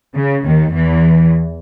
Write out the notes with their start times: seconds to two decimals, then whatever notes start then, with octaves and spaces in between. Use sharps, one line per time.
0.15 C#3
0.44 D#2 D#3
0.73 E2 E3